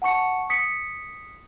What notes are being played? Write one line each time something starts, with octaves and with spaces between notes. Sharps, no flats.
F#5 A5 C#6 C#7
D#6 B6 C#7